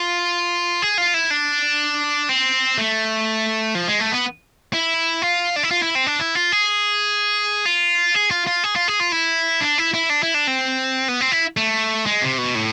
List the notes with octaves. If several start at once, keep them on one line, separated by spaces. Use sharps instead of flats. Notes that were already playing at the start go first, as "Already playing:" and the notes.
Already playing: F4
G#4
F4
E4
D4
C4
A3
F3
G#3
A3
B3
E4
F4
D4
E4
F4
E4
C4
D4
E4
F4
G#4
F4
G#4
F4
F4
G#4
F4
G#4
F4
E4
D4
E4
E4
D4
E4
D4
C4
B3
C4
E4
A3
G#3
C3
B2
A2